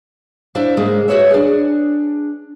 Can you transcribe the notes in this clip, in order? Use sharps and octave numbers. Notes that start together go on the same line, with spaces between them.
D4 E4 C5 E5 F5
G#2 C#3 G#3 A#3
F#4 G#4 B4 C#5 E5
D4 G#4